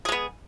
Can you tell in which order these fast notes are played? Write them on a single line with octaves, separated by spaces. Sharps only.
G#4 G#3 B3